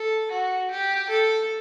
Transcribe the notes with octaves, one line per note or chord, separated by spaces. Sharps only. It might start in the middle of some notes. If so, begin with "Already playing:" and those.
Already playing: A4
F#4
G4
A4